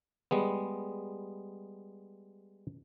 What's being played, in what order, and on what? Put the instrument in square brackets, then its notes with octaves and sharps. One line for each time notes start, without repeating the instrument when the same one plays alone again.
[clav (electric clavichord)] G3 G#3 B3